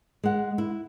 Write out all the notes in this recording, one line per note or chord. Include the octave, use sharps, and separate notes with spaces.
G#3 F#5
E4